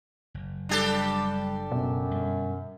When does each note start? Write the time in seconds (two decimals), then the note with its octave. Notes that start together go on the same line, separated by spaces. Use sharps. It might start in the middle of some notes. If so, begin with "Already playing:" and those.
0.34 F#1
0.69 G3 D4 G4 A4
1.72 F#2 B2
2.11 G2 D3 G3